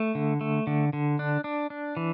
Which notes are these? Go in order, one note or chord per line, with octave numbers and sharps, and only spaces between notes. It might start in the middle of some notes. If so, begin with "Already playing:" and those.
Already playing: A3
D3
A3
D3
D3
D4
D4
D4
E3